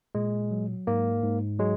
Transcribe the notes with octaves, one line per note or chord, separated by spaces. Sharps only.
A#2 G#3
F#3
G#2 A#3
G#2
F#3 G#3